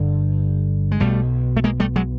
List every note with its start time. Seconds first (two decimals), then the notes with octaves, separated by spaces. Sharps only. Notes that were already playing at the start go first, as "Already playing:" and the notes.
Already playing: G1 G2 D3
0.92 G#3
1.00 B1 B2 G3 A3
1.57 A3
1.64 G#3 A#3
1.80 G3 A3
1.96 F#3 G#3